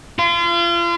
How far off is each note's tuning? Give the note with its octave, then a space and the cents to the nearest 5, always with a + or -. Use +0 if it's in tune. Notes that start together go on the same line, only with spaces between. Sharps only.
F4 -35